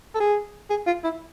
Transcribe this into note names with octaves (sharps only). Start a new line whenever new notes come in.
A4
G#4
G#4
F4
E4